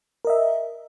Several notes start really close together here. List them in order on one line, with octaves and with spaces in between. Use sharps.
A#4 D#5 E5